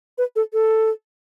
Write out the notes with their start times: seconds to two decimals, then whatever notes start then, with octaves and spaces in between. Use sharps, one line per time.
0.18 B4
0.36 A4
0.53 A4